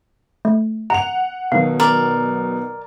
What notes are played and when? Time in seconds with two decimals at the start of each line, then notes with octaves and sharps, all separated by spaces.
0.45 A3
0.90 F#5 A#5 F7
1.52 B2 D#3 F#3 F5
1.80 A#4 D5